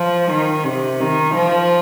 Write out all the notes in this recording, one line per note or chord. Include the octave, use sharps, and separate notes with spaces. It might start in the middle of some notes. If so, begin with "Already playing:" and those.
Already playing: F3
D#3
C3
D#3
F3